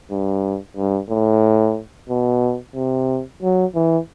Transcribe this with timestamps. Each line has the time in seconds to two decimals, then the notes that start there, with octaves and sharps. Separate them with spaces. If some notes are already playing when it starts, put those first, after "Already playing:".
0.11 G2
0.77 G2
1.09 A2
2.10 B2
2.75 C3
3.42 F#3
3.75 E3